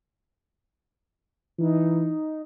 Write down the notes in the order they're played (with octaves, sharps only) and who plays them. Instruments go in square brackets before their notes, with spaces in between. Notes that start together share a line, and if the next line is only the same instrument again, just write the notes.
[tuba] E3 [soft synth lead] D#4